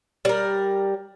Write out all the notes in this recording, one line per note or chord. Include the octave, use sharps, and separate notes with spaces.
G3 A#4